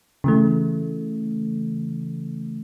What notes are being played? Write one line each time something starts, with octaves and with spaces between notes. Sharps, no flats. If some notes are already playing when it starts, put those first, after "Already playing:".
C#3 E3 A3